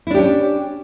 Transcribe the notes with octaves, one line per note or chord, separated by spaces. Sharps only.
C#4 D4 E4 G4